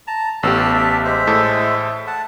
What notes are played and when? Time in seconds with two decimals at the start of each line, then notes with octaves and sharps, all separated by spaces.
0.07 A5 A#5
0.43 A1 B3 G4 A4 A5
0.74 E5 A5
1.05 G#3 C5 E5
1.27 A2 A4
2.07 F#5 A5